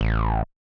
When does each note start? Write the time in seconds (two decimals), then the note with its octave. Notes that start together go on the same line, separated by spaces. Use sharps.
0.01 A1